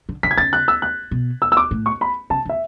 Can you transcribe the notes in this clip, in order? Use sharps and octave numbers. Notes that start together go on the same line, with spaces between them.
D3
D3 B6
G#6
C#3 A6
F#6
E6
F#6
B2
E6
E6
D6
A2
C#6
B5
C#3 A5
D3
E5